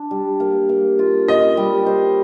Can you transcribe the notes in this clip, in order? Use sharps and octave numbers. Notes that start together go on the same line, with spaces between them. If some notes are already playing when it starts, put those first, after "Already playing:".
Already playing: D4
G3
A#3
A#3
F4
F4 D#5
G3
C5